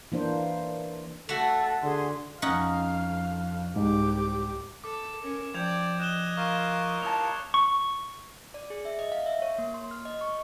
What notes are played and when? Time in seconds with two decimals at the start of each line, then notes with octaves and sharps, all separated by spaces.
0.12 E3 A#3 D4 C5
1.29 A3 F#4 A4
1.83 D3 G#4 C6
2.42 F2 C#4 D#4 F5 F#5
3.76 C2 G#2 G4 D6
4.84 A4 D6
5.22 C#4 A#4
5.54 F3 D5 G5 G6 G#6 F7
6.00 D#5 F#6 E7 G7
6.37 F4 A#4 F5 C#6
7.02 C2 C#5 A5 D#6 F7
7.54 C#6
8.54 D5
8.70 G#4
8.85 E5
8.99 D#5
9.12 F5
9.26 E5
9.42 C#5
9.58 A#3
9.74 C6
9.91 F6
10.05 D#5
10.21 C#6